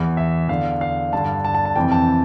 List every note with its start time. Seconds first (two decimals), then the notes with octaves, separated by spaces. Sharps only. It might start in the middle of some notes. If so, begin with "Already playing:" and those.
Already playing: E2 E3
0.17 E5
0.49 E2 D3 F5
0.81 F5
1.13 G2 D3 A5
1.45 A5
1.55 A5
1.65 A5
1.76 F2 C3 E3 G5
1.92 A5